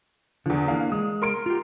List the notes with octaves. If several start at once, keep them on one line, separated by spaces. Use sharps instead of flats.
E2 D3 F3
E3 A#3 D4 F5
G#3 D#6
A#4 C6 D7
F4 G4